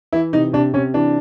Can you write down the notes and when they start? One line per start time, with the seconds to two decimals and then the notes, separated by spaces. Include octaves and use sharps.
0.12 E3 E4
0.33 C3 D#4
0.53 C3 D4
0.73 C3 C#4
0.94 E3 D4